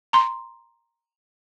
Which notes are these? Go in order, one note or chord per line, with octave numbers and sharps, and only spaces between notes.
A#5 C6